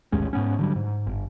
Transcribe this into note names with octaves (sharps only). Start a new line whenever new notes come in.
A1 D#2 G#3 C#4
G#2 B3 C#4
D3 F#3 G3
G#2
G1